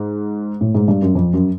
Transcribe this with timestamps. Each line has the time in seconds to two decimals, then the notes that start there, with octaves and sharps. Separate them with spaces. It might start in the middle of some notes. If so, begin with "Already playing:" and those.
Already playing: G#2
0.61 A2
0.75 G#2
0.88 G2
1.02 F#2
1.15 F2
1.34 F#2